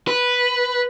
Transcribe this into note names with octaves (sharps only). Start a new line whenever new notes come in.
B4